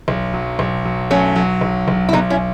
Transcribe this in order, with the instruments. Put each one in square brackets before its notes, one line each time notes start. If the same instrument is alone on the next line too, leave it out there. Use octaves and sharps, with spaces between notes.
[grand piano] B1
F#3
B1
F#3
[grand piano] F#3 [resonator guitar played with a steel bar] A3 C#4
[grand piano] F#3
B1
B1
[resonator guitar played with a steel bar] E4
[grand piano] B1 [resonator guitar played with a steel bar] B3 D#4
[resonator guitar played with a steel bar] C#4 E4